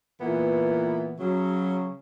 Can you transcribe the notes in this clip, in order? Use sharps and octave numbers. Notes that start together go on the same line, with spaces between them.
A#2 E3 B3
C#3 F#3